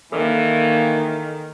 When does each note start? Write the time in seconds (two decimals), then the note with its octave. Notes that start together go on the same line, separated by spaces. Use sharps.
0.12 D#3 E3 A#3 A4